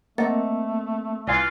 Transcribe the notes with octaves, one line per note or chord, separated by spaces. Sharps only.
A3 A#3 C4 D#5 F#5 A6
C2 E3 F4 D5 G#5